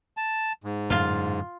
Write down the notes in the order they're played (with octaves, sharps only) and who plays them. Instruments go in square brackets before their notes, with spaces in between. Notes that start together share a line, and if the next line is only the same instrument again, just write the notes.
[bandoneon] A5
G#2
[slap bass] F#2 A2 D3 [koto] F4 F5